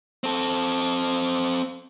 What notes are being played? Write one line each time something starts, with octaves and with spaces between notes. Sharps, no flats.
C4 A4